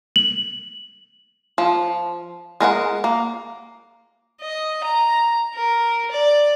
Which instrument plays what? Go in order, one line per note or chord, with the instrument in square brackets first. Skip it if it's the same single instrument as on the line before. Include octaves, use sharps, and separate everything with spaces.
[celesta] F#7
[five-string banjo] F3
G#3 A#4 B4 F#5
A#3
[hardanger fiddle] D#5
A#5
A#4
D5